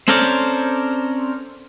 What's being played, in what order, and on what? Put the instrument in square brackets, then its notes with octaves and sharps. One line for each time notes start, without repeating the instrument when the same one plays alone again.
[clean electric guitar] C4 C#4 A4 A#4 C5 D5